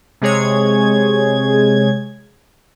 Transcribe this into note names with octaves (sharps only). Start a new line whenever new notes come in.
C3 G#3 G#4 C#5 G#6